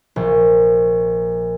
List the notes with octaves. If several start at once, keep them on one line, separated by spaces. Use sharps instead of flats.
A#1